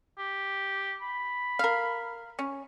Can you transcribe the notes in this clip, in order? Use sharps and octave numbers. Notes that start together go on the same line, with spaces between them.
G4
B5
A#4 F5
C#4